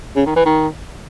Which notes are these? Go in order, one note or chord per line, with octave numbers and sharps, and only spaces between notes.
C#3
D#3
E3
D#3